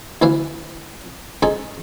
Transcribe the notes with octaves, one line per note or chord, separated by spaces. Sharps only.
D2 E3 E4 B4 E5 F5
C#2 D#4 G#4 A4 D#6